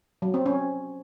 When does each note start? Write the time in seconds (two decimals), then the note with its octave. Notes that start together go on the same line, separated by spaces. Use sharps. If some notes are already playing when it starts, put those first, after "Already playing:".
0.22 F#3
0.34 C4
0.46 C#4